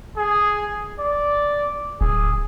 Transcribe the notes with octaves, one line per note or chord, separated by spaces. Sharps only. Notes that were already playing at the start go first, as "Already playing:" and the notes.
G#4
D5
D1 G#4